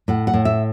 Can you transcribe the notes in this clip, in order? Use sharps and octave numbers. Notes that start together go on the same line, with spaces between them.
A2 F#5
F#5
A2
E5